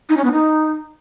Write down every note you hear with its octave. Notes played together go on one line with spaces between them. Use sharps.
D#4
C#4
B3
D#4